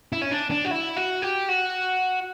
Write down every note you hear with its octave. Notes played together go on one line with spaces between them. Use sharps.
E4
C#4
D4
D4
F#4
E4
F#4
G4
F#4